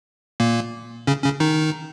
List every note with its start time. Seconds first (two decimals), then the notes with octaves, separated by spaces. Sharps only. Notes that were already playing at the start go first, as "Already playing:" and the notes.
0.40 A#2 A#3
1.07 C#3 C#4
1.24 C#3 C#4
1.40 D#3 D#4